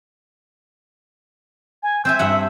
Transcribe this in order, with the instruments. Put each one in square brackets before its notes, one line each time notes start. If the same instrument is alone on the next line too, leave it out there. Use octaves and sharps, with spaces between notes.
[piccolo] G#5
[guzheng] C4 E5 G#5 [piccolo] G6
[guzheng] G2 E5 F#5 [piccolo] E6